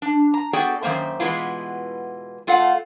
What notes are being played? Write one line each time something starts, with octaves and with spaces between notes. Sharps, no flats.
D4
A#5
B3 F#4 G#4 A4 D5 G5
F#2 D#3 G3 A#3 C5 E5
B2 E3 G#3 B3 E4 F4
A3 F4 A4 F5 F#5